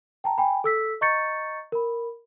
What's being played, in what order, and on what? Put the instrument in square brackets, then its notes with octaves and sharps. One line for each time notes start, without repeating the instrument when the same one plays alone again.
[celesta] G5 A5 A#5
G5 G#5 B5
A4 E6 B6
D#5 A#5 C#6 G6 A6 C#7
A#4 B5